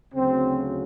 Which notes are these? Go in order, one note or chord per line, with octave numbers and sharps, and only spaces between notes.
D2 C#3 F#3 C4